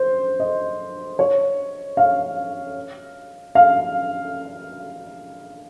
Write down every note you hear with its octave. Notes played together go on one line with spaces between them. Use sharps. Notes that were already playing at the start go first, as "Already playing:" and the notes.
Already playing: C5
D#5
C#5
F5
F5